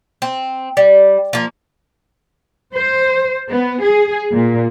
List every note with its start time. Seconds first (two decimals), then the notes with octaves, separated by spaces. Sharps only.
0.22 C4
0.77 G3
1.33 F3 A#3
2.74 C5
3.51 B3
3.82 G#4
4.32 A#2